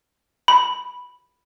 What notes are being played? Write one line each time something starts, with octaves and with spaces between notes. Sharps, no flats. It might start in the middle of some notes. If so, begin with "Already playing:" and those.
B5